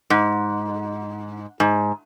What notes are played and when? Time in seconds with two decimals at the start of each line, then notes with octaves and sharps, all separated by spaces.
0.10 G#2
1.60 G#2